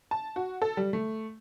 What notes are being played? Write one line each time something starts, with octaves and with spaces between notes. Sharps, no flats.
A5
F#4
A4
G3
A3